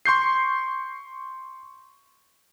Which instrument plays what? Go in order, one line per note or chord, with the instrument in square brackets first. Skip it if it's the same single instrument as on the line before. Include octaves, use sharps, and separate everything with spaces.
[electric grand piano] C6 C#6 G6 C7